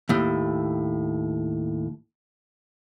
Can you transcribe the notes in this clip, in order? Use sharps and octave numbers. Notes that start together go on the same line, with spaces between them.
D#2 A2